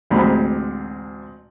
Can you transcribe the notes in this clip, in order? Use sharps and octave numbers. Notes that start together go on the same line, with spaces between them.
A1 D2 G#3 C4 A#5 B5